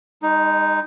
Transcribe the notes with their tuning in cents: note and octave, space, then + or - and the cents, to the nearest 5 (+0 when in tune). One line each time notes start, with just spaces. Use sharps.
G#3 -40 D#4 +0